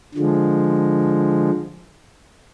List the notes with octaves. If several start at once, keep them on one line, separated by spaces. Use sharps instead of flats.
D3 F3 G#3